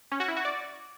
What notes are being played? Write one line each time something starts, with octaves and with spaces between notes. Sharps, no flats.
C#4
F#4
E4
F#4
D5